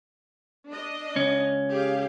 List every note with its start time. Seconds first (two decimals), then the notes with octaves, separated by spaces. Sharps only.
0.69 D4 D#5
1.16 C#2 C#4
1.71 G4 G#4 F5